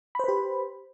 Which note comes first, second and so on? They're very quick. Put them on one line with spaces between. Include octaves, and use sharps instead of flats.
B5 C5 B4 G4